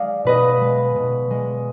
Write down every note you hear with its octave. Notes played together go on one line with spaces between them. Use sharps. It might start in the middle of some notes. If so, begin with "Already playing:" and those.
Already playing: G#3 D5 F5
B2 B4 D#5
G#3
B2
G#3